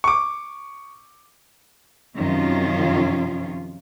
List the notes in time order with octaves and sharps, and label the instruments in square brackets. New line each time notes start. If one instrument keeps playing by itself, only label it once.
[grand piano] C#6 D6
[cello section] F#2 C3 D#3 F3 C#4 F4